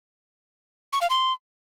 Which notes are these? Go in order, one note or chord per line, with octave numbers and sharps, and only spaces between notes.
C#6
F5
C6